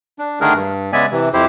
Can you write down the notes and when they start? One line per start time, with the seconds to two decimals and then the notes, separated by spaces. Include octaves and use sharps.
0.19 D4
0.41 D3 D#3 A3 D4 G#4 A#4
0.55 G2
0.93 C#3 G#3 B3 D5 E5 G#5
1.12 C3 E3
1.34 F2 E4 G4 C5